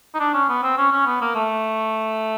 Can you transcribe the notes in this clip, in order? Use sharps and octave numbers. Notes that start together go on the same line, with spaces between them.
D#4
D4
C#4
B3
C4
C#4
C#4
B3
A#3
A3